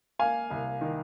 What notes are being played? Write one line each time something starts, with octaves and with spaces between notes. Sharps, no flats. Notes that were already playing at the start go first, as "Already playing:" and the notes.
A#3 F5 G#5
C2
D#3